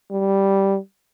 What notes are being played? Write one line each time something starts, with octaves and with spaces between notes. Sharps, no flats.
G3